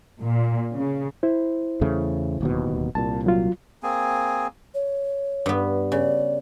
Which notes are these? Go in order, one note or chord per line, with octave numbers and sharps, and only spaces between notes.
A#2
C#3
E4 C5
E2 C#3 A3
D1 D#2 B2
C2 A#2 A5
F#3 F4
A#3 C4 G#4 G#5
C#5
G2 B3
C#3 D5